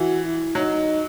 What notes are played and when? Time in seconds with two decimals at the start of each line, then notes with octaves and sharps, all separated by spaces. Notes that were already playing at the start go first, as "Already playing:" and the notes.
Already playing: E3 F#4
0.25 E4
0.55 F#3 D#4